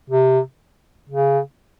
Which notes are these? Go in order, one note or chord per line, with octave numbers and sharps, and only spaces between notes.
C3
C#3